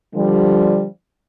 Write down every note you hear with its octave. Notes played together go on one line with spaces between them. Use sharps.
D3 F3 G3